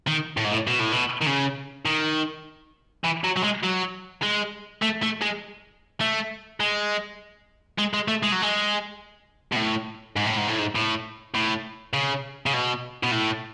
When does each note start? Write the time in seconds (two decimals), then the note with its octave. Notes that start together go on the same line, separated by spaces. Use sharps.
0.08 D#3
0.37 A2
0.45 G#2
0.52 A2
0.67 B2
0.80 A2
0.92 B2
1.21 D#3
1.26 C#3
1.86 D#3
3.04 E3
3.24 F#3
3.36 F#3
3.43 G#3
3.64 F#3
4.23 G#3
4.82 A3
5.02 A3
5.22 G#3
6.01 A3
6.60 G#3
7.79 G#3
7.94 G#3
8.08 A3
8.23 G#3
8.32 F#3
8.42 G#3
9.52 B2
9.56 A2
10.16 G#2
10.26 A2
10.38 G#2
10.48 A2
10.59 G#2
10.75 A2
11.34 A2
11.93 C#3
12.46 C#3
12.53 B2
13.03 B2
13.12 A2